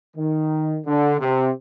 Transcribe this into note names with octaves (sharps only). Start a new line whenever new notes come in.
D#3
D3
C3